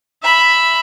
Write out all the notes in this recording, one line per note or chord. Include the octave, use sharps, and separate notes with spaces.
E5 B5